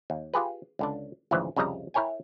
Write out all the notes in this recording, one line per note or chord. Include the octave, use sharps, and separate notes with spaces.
D#2
F4 G4 G#4 B4
C#2 D3 D4
G#1 D2 G#2 C#3 E3 F3
C2 F2 C#3 G3 D#5 A#5
E4 A#4 C#5 G5 G#5